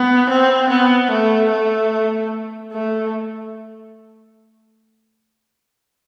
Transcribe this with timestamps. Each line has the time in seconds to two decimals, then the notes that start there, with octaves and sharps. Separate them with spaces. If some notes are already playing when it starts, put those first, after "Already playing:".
Already playing: B3
0.30 C4
0.70 B3
1.11 A3
1.51 A3
2.72 A3